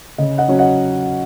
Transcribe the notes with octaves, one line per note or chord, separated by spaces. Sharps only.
C#3 D#5
D#5 F#5
F#3 C#4
D#5 F#5